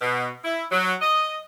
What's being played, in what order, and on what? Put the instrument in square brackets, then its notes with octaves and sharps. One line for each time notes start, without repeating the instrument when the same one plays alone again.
[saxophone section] B2
E4
F#3
D#5